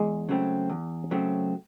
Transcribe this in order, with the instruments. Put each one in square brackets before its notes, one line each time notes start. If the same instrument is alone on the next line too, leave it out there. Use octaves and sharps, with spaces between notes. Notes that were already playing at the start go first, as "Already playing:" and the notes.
Already playing: [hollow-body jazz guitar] E2 [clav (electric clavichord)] G#3
[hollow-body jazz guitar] C#3 F#3 A3 C4
E2
C#3 F#3 A3 C4